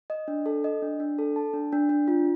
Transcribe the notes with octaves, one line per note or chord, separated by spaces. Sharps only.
D#5
D4
A4
D#5
D4
D4
A4
A5
D4
D4
D4
F4